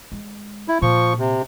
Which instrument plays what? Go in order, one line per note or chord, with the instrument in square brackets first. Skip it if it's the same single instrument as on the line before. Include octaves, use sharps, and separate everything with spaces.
[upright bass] G#3
[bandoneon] E4
[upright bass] A#2 [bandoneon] F3 C#6
[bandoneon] C3